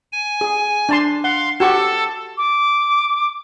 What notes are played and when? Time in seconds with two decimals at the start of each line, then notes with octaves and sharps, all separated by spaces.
0.12 G#5
0.41 G#4
0.89 D4 A5 C6
1.24 F5 F#5 C6
1.60 F#4 G4 A4 A5 C#6
2.38 D6